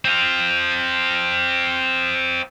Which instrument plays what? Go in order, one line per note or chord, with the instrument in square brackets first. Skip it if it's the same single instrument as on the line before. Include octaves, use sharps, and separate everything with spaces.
[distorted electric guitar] C4 F4